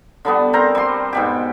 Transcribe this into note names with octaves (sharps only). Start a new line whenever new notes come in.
D3 G3 B3
C4 A#4 C5 A#5
G3 C6
G#2 B2 G4